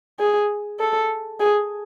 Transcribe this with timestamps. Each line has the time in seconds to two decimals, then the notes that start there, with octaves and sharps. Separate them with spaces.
0.19 G#4
0.80 A4
1.40 G#4